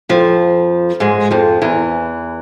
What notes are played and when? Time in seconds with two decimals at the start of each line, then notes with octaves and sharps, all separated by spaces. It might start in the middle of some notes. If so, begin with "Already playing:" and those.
0.09 F2 F3
1.00 G#2 G#3
1.31 F2 F3
1.62 E2 E3